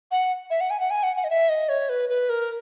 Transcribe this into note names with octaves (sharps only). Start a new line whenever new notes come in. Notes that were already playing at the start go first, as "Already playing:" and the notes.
F#5
E5
F#5
G#5
F#5
G#5
F#5
F#5
D#5
E5
D#5
C#5
B4
B4
A#4